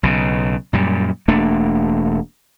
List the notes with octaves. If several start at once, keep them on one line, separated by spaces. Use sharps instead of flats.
B1 C#3
F#2 A#2 G3
E1 A3 A#3 D4